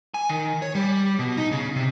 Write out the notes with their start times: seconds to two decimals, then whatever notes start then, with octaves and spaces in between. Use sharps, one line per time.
0.14 G#5
0.29 D#3
0.62 C#5
0.75 G3
1.19 B2
1.37 D#4
1.51 C#3
1.76 C3